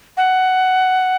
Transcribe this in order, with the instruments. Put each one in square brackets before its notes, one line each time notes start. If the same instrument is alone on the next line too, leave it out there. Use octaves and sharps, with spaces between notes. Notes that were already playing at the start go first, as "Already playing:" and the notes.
[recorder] F#5